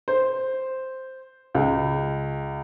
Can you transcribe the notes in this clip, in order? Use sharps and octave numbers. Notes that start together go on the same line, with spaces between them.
C5
C#2